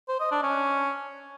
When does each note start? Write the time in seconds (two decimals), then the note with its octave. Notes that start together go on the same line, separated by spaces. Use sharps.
0.09 C5
0.20 D#5
0.31 D4
0.43 C#4